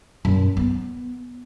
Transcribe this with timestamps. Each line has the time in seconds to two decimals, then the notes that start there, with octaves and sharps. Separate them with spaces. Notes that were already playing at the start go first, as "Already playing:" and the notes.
0.25 F#2
0.57 B3